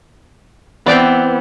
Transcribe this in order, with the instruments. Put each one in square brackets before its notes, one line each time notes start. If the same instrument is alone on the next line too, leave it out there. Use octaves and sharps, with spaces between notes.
[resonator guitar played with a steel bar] E3 C4 [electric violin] B3 [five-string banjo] B4 D5 G5